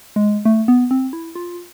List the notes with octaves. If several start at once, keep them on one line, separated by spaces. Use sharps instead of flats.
G#3
A3
B3
C4
E4
F4